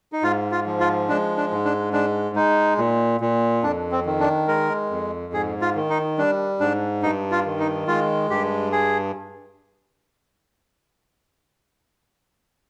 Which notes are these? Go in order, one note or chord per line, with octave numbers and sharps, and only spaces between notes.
D#4
G#2 F4
F4
F3
F4
G#3 D4
D4
G#2
D4
G#3 D4
G#3 D#4
A#2
A#2
F2 D4
C4
D#3
D4
G#3 A#4
F2
G#2 G#4
F4
D#3
D#4
G3 D4
G#2 D4
G2 D#4
F4
D#3
D#4
G#3 F4
G2 G4
G#4